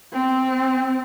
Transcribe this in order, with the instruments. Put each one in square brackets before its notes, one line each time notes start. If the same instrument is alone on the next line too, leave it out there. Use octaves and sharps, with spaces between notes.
[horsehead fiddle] C4